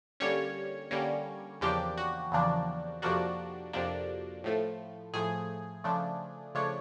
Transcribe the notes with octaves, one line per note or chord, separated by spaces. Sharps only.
D3 G3 A#3 C#4 C#5
D3 G3 A#3 C#4
E2 C#3 F3 A#3 D4 G4
F#4
E2 C#3 F3 A#3 D4
F2 C3 F3 A#3 D4 F#4
F2 C3 F3 A#3 D4
A2 F3 A3
A2 F3 A3 G#4
C#3 F3 A3 D4
C#3 F3 A3 D4 C#5